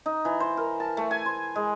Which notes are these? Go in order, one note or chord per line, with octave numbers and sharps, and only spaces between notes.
D#4
E3
C5
A#4
A5
A3
G#5
C5
G#3